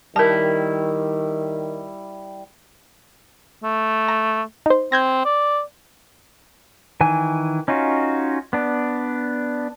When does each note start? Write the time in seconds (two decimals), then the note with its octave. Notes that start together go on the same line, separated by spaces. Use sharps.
0.16 D#3 G3 E4 A#4 A5
3.63 A3
4.08 A#5
4.66 D#4 C5
4.92 C4 G6 G#6 A#6
5.25 D5
7.01 D#3 E3 G#5
7.68 C#4 D#4 F4 F#4
8.53 B3 D4